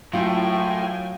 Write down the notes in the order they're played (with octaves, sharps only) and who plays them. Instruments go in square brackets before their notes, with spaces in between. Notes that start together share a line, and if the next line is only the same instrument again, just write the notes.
[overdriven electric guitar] A2 [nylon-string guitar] F#3 A#3 C#4 [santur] F4 [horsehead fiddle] G5 G#5